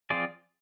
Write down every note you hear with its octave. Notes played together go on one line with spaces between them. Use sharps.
F3 C4 F4 G#4 D5